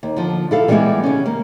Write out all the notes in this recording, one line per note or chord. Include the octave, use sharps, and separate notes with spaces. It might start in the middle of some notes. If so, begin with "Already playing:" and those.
D#2
D3 F3
E4 A4 F5
E3 G3 G#3 B3 E4 G4
C#3 C#4
A#3